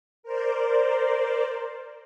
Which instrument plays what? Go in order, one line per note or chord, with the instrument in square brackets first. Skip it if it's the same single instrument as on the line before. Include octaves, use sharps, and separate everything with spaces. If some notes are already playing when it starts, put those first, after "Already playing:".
[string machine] A#4 C5 D5